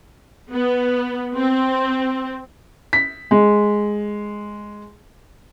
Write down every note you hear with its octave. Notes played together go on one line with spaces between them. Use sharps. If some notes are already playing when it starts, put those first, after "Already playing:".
B3
C4
B6
G#3